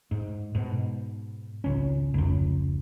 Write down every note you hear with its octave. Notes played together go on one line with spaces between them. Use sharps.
G#2
G#2 B2
G#1 C#2 C#4
F1 C#2